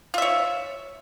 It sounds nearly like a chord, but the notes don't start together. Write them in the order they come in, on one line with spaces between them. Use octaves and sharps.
F4 E5 C#5